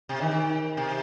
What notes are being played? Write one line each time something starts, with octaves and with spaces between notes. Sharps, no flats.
C3
D#3
C3